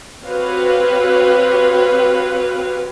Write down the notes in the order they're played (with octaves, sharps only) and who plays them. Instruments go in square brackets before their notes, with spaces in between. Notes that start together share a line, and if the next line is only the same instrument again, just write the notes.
[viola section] C4 F#4 G4 B4 C#5 F5